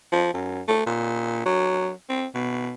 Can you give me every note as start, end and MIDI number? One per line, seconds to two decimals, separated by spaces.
0.12 0.31 53
0.34 0.61 42
0.68 0.81 57
0.86 1.44 46
1.46 1.91 54
2.09 2.26 60
2.35 2.74 47